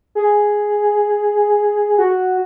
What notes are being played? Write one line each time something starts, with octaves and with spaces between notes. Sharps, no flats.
G#4
F#4